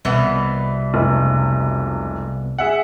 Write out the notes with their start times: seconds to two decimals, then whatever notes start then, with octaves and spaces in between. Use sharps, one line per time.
0.05 C2 B2 E3 B3
0.94 F1 C#2
2.58 G#4 E5 F#5